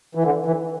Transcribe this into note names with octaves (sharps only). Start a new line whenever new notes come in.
E3
D3
E3